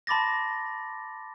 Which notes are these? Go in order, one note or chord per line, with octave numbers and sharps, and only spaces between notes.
A5 B5 C6 D6 A6 A#6